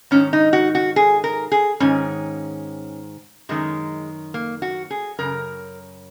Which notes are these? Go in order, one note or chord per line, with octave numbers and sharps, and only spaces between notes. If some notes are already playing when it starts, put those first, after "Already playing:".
G#2 D#3 C#4
D#4
F#4
F#4
G#4
A#4
G#4
G#2 D#3 C#4
F#2 D#3 G#3
A#3
F#4
G#4
F#2 C#3 A#4